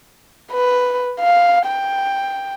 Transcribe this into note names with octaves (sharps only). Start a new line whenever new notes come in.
B4
F5
G5